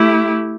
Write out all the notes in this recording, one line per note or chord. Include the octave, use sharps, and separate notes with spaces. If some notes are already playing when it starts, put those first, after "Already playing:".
Already playing: A3 E4 G4